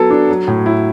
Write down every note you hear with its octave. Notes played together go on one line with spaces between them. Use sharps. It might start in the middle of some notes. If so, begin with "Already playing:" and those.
Already playing: F#3 B3 A4
D4
F#3
A2
E4